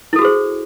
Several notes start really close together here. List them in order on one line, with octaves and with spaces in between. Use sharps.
E4 A4 F#4 G#4 C5